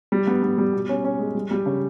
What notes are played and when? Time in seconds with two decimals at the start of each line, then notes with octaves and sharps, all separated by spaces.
0.12 G3
0.27 B3
0.43 B3
0.58 G3
0.73 B2
0.89 C#4
1.05 C#4
1.19 G#3
1.35 G3
1.51 G3
1.66 C#3